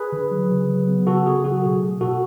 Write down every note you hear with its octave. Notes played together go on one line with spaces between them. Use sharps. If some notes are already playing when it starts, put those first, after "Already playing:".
Already playing: G#4 B4
D3
F#3
C#3
F#3
B3
C#3 F#4 A4
C#3 G#4
F#3 F#4
B2 G#4
A3
B2 F#4 A4